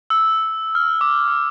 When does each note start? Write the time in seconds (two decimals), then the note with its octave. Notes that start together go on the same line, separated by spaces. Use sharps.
0.10 E6
0.75 F6
1.01 D6
1.28 E6